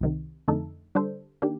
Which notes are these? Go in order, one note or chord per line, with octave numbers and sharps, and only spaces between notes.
C2 C3 D#3
F2 D3 A3 D#4 A4
D3 G3 D4 A4 C5
D#3 A#3 D4 G4